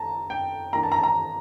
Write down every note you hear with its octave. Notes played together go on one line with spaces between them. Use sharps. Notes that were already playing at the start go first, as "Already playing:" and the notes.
Already playing: A5 A#5
G5
E3 A#3 D4 A#5
A5
A#5
A5
A#5